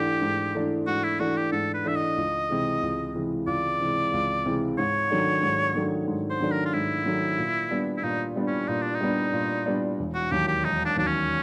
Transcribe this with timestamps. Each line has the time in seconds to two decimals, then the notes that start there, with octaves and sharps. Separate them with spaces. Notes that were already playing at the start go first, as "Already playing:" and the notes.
Already playing: G#2 E3 A3 D4 G4
0.22 G#2
0.55 E3 A3 D4
0.87 G#2 F#4
1.04 E4
1.20 E3 A3 D4 F#4
1.37 G4
1.52 G#2 A4
1.74 B4
1.85 E3 A3 D4 E5
1.96 D#5
2.17 C#2
2.50 C3 E3 G#3
2.82 C#2
3.16 C3 E3 G#3
3.47 C#2 D5
3.81 C3 E3 G#3
4.13 C#2
4.46 C3 E3 G#3
4.78 G#2 C#5
5.10 D#3 F#3 A3 D4
5.43 G#2
5.75 D#3 F#3 A3 D4
6.08 G#2
6.30 C5
6.41 D#3 F#3 A3 D4
6.51 A#4
6.65 F4
6.74 G#2 E4
7.06 D#3 F#3 A3 D4
7.38 A#2
7.71 G3 B3 D4
7.97 E4
8.03 A#2 D#4
8.36 G3 B3 D4
8.47 C#4
8.68 A#2 D#4
8.81 D4
8.94 D#4
9.01 G3 B3 D4
9.33 A#2
9.66 G3 B3 D4
9.99 E1
10.15 F#4
10.31 D#2 D#3 F#3 G4
10.48 G4
10.64 E1 D#4
10.85 D4
10.97 D#2 D#3 F#3 D4
11.07 C#4